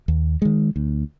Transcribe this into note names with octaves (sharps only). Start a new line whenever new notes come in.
D#2
D#3 G#3
D2